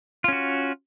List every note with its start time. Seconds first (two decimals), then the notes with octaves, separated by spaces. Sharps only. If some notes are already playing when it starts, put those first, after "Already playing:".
0.24 F4
0.28 C#4
0.33 F#4